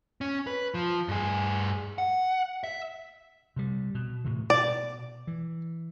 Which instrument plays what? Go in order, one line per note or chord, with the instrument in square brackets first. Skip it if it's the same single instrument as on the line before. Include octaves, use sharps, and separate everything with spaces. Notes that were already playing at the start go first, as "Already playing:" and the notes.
[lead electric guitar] C#4
B4
F3
G2 G#4
F#5
E5
[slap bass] C3 G3
B2
A2 C3 E3
[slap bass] B2 [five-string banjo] D5
[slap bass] E3